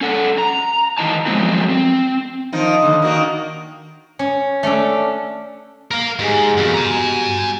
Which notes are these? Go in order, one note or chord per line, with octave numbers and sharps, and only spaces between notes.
C#4 A4 F#5
A#5
D#3 E3 D#4 A5
F3 F#3 G#3 B3 C4 E4
C4
D#3 F3 D#4
D#2 D3
D#3 A#3 F#4
C#4
A3 C#4 D4 A4
A#4 F5
G#2 G4 G#4 G#5
F2 D#3 B3 F#4 G4
G#5 A#5